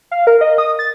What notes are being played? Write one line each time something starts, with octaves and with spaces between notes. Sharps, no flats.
F5
A#4
D#5
D#6
A6